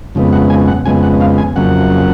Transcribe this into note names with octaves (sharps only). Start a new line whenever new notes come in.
F2 C#3 G#3 B3
F#5
G#5
F#5
F2 C#3 G#3 B3 G#5
F#5
F5
G#5
F2 C#3 F#3 A#3 F#5